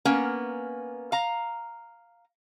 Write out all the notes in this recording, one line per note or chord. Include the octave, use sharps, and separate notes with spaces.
A#3 B3 C#4 A#4
F5 A#5